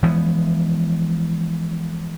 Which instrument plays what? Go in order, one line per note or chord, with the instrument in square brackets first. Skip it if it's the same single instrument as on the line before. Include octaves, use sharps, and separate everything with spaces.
[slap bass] E3 F3 G#3 B3